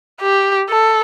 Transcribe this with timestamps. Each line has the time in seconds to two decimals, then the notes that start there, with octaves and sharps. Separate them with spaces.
0.21 G4
0.70 A4